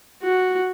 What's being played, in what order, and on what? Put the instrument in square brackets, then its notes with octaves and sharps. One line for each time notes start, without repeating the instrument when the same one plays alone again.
[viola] F#4